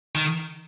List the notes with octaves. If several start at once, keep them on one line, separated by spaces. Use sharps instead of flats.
D#3